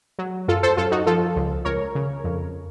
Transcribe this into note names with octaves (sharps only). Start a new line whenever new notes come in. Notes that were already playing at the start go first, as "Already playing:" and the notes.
F#3
F#2 F4 A4
A4 C5
F#2 F4 A4
D#4 F#4
F3 F4 A4
C#2
C#2 A#4 C#5
C#3
F2